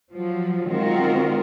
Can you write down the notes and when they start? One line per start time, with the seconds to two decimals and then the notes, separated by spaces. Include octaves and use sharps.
0.11 F3 F#3
0.68 D#3 G#3 C4 F4 F#4 A#4